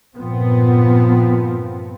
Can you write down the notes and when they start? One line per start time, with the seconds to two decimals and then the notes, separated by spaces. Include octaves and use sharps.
0.15 G2 A#2 F3 B3 C4